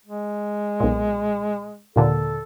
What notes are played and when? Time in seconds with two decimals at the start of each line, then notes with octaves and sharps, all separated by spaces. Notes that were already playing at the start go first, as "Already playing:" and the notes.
0.06 G#3
0.80 B1 A#2
1.96 D#2 A#2 D3 A4